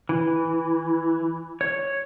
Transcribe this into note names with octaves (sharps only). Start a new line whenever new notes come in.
E3
C#5